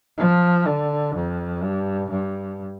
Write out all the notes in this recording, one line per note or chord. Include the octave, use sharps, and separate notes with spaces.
F3
D3
F2
G2
G2